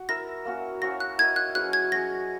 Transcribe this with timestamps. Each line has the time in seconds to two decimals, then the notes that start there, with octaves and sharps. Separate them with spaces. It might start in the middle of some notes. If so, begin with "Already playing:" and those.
Already playing: F#4
0.09 E4 A#4 E5 A#6
0.45 A#3 C#4 F#4
0.82 C#4 F#4 C#5 E5 A#6
1.00 F#6
1.18 E4 A#4 D#5 G#6
1.36 F#6
1.55 F#3 C#4 G#4 B4 F#6
1.73 G#6
1.92 F#3 C#4 G#4 C#5 A#6